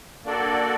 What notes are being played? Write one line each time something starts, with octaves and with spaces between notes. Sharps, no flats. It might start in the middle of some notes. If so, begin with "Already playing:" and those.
A#3 D4 F#4 A4 D5